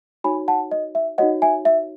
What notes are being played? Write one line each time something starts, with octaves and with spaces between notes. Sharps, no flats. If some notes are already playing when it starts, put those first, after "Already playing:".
D#4 F#4 C#5 G#5 B5
F#5 A5
D#5
E5
D#4 F#4 C#5 D#5 F#5
E5 G#5
E5